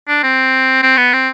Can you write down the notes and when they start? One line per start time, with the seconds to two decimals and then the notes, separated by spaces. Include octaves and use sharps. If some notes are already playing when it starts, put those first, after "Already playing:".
0.08 D4
0.23 C4
0.83 C4
0.97 B3
1.13 C4